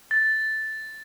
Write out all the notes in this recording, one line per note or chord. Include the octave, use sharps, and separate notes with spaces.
A6